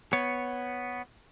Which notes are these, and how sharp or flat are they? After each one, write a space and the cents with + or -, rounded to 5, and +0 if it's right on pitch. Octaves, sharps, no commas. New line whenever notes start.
B3 +0 C#5 +0